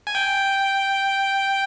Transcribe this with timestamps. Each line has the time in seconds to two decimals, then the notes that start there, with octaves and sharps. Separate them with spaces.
0.07 G#5
0.15 G5